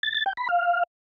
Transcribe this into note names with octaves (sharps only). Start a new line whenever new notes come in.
A6
A6
G5
B5
F5